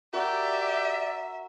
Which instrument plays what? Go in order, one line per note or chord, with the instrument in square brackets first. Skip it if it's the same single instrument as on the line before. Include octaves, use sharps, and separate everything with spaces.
[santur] F#4 A#4 [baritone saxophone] G4 [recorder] D5 [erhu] E5